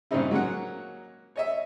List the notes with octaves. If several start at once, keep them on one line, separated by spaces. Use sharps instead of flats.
G2 A#2 C#3 C4 D#4 E4
F#3 G#3 A#3 C#4 F#5
C#5 D#5 E5